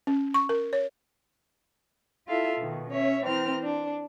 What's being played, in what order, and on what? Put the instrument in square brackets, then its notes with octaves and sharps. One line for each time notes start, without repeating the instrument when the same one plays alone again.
[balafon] C#4
C#6
A#4
C#5
[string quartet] E4 F4 A4 E5 F5
B2 D#3
C#4 C#5 E5
E3 C4 C5 A#5 F6
D4